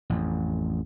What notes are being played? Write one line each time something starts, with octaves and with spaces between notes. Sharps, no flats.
A1 F2